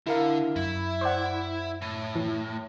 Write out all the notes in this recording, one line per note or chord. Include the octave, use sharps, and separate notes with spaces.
D3 E4 A#4 F5
F#2 E4
C5 D5 F#5
A2
E3